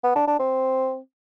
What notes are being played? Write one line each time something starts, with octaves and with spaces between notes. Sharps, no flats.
B3
D4
D4
C4